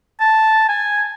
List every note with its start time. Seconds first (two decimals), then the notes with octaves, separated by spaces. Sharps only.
0.20 A5
0.69 G#5